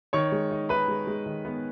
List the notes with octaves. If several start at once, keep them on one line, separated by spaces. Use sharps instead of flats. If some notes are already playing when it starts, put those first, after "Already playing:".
D#3 C#5 C#6
G#3
D#4
D#4 B4 B5
G#3
G#3
D#3
B3